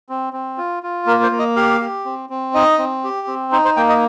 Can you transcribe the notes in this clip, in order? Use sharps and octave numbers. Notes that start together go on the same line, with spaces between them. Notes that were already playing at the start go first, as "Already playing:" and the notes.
C4
C4
F4
F4
A#3 A#4
C5
A#3
D#5
G4 F5
G4
C4
C4
D#4 D#5
C4
G4
C4
D#4 C5
C5
A#3 G5
D#5